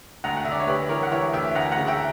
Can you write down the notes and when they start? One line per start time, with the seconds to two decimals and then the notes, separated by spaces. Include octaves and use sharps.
0.24 D2 F#5 A#5
0.37 F#5
0.45 D2 E5
0.52 D5
0.60 C#5
0.67 D2 G4 B4
0.89 E3 A#4 C#5
1.03 F#5
1.11 E3 C#5 E5
1.33 D2 E5 G5
1.55 D2 F#5 A#5
1.72 F#5 A#5
1.77 C#3
1.87 E5 G5